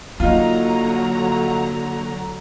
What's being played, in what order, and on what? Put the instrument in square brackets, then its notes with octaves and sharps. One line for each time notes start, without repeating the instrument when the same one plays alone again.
[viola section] D3 F#3 A#5 [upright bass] A#3 [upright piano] D#4 F4